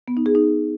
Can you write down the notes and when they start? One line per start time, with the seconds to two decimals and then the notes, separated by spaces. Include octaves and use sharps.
0.08 B3
0.17 D#4
0.26 G#4
0.35 D#4